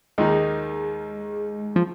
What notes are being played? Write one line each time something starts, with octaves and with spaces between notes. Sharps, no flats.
D#2 D#3 G#3 A#3 D#4
F3